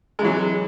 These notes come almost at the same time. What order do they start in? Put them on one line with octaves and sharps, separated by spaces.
G#3 E3 F#3 C3